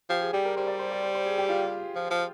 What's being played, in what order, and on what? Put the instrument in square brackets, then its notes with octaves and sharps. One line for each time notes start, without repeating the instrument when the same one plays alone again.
[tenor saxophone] F3 [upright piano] G4
[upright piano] G#4
[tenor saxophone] G3 [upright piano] G4
[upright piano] A#4
[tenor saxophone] G3 [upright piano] C5
[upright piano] D5
C5
D5
C5
C5
G#4
G4
F4
[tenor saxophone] F3
F3